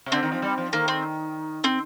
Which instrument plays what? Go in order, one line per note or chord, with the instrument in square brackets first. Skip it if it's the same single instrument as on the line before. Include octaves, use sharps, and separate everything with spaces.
[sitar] C3
[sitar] D3 [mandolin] C4
[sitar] D#3
F3
G3
F3
[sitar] D#3 [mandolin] A#3
[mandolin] C4
C4